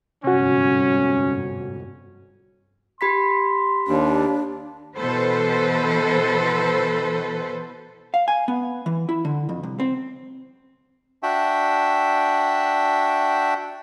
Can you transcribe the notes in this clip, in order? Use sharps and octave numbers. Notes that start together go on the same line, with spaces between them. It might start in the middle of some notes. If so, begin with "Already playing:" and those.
G1 F2 G#2 C3 C#4 F#4
G4 B5 C6 B6
D#2 D4
B2 E3 A4 B4 C5
F5
G#5
B3
E3
E4
D3
F2
C2
C4
D4 F#4 E5 G5